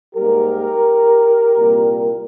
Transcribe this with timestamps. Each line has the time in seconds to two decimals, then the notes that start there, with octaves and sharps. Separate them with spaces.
0.15 G#2 G3 A#3 G4 A#4
1.58 C2 A#2 G3 A#3